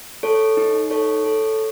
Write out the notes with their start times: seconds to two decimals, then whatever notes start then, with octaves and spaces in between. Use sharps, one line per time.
0.23 A4 C#5
0.57 D#4
0.90 A4 C#5
1.24 A4